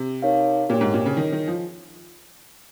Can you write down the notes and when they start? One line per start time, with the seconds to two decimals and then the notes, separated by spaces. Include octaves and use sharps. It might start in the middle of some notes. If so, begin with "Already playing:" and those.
Already playing: C3
0.22 D#4 A#4 C#5 F5
0.69 A#2 G4 A#4 C#5 G5
0.81 G#2
0.94 A#2
1.06 C#3
1.17 D#3 G#4 C#5 G#5
1.32 D#3
1.48 F3